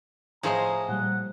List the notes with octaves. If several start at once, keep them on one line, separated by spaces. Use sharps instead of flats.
A2 F3 G#4 C5 D#5 A#5
A#2 G3 F#5